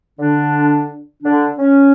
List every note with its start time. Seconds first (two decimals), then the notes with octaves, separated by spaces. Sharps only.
0.19 D3 D4
1.23 D3 D4
1.58 C#4